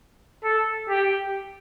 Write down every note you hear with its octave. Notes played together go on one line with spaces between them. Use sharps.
A4
G4